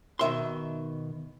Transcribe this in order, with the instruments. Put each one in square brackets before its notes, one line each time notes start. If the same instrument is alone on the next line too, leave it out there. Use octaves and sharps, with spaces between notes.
[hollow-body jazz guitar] B2 D#3 E5 C6